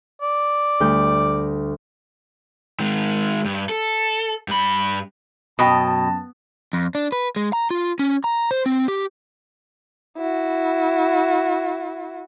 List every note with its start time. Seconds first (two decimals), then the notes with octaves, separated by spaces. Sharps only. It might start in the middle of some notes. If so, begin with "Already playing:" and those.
0.22 D5
0.80 D2 G3 G6
2.79 D#3 G#3
3.45 G2
3.69 A4
4.48 G2 B5
5.59 F#2 B2 G5 A5 B5 D#6
6.73 F2
6.95 D4
7.12 B4
7.36 G#3
7.53 A#5
7.71 F4
7.99 C#4
8.24 A#5
8.51 C5
8.66 C4
8.88 G4
10.17 E4 F#4